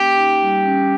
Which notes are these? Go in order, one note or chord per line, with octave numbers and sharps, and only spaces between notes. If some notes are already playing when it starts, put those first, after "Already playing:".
Already playing: A#3 C#4 G4
D#4
G3
C#4